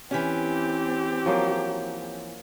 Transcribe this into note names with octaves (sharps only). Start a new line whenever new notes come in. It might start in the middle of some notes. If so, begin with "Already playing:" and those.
E3 C4 C#4 G4
F3 F#3 A#3